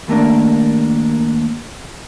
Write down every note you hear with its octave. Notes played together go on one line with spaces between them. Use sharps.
D#2 A3 A#3 D4